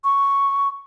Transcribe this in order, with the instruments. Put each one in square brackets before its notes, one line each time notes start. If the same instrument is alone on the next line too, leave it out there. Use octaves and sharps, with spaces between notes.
[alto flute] C#6